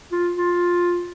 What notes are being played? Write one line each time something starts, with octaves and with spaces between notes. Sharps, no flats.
F4
F4